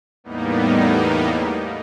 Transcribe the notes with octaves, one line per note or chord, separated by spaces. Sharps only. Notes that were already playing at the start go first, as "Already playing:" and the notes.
E2 A2 G3 A#3 B3 D#4